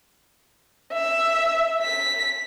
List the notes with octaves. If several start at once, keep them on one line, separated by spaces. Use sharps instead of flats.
E5
B6